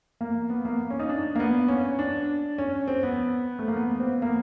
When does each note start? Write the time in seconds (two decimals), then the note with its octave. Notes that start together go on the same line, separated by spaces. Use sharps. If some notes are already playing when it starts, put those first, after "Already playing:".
0.21 A#3
0.50 B3
0.65 A#3
0.90 C#4
0.99 D#4
1.09 D4
1.35 A#3
1.40 B3
1.68 C#4
1.99 D4
2.58 C#4
2.88 C4
3.03 B3
3.59 A3
3.68 A#3
3.76 B3
4.00 C4
4.07 B3
4.22 A#3